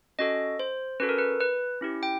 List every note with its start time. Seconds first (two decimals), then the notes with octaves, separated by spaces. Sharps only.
0.19 C#4 F#4 A4 D#5
0.59 C5
1.00 C#4 F#4 A4 B4
1.09 A#4
1.18 B4
1.40 B4
1.81 C#4 E4 G4
2.03 G5